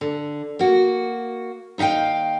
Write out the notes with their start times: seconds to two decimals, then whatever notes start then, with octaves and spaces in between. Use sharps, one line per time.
0.01 D3
0.59 A#3 F#4
1.78 D#2 D#4 E5 F5 G5